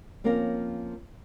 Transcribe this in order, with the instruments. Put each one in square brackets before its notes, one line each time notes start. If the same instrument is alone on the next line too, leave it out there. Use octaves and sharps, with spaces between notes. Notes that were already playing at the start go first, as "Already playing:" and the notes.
[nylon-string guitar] F3 A#3 C4 C#4 A#4